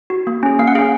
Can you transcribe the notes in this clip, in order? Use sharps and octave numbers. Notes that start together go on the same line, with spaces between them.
F#4
A#3
C#4 G#4
A#3 F5
F#5
C#4 G#4 F5